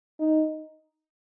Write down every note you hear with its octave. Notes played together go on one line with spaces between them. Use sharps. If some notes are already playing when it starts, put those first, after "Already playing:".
D#4